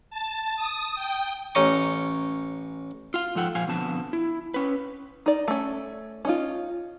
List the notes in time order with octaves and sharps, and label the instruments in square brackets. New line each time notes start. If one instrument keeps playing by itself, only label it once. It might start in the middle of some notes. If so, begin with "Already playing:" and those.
[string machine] A5
D#6
G5
[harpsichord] A1 C#4 D#4 C#5 D#5 D6
[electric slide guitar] F4 F5
G#2 F3 A4 F#5 G5
A#2 F3 F5 G#5
F2 B2 D3 A5
E4
C#4 B4
[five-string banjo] D#4 D5
A3 C#4
C#4 D#4 F4